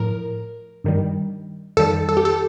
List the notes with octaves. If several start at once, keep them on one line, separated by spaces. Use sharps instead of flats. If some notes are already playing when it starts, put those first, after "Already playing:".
Already playing: A2 F3 A#4
G2 D#3 G3
F2 D#3 G3 A4
A4
G4
A4